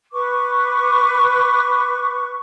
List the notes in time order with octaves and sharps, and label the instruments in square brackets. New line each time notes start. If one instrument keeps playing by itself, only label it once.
[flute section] B4 C#6 D6